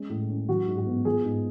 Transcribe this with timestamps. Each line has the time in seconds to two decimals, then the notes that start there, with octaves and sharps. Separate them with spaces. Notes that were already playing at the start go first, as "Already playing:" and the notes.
Already playing: G#3 C#4
0.10 A2
0.29 C#4
0.49 F#3 F#4
0.67 G#2
0.77 F#4
0.86 B3
1.05 F3 G#4
1.25 G#2